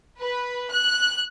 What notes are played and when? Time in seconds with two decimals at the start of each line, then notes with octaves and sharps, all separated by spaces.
0.19 B4
0.71 F#6